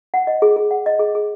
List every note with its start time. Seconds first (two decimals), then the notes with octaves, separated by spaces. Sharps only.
0.14 F#5
0.27 D#5
0.42 G#4
0.56 G#4
0.71 F#5
0.86 D#5
0.99 G#4
1.15 G#4